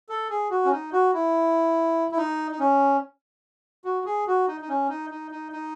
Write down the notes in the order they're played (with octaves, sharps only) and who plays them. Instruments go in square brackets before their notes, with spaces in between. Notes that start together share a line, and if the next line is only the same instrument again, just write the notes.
[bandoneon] A4
G#4
F#4
C#4
D#4
F#4
E4
E4
D#4
D#4
C#4
F#4
G#4
F#4
D#4
D#4
C#4
D#4
D#4
D#4
D#4